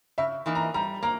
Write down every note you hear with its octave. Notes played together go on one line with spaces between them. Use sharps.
C#3 E5
E3 A#3 D#4
A#5
G3 A#5
A#3 A#5